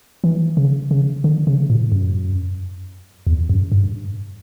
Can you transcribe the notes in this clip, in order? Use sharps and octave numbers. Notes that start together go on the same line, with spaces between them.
E3
C#3
C#3
D3
C#3
A2
F#2
E2
F#2
G2